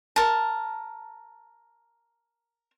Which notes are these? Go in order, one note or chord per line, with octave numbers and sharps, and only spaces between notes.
A#4 A5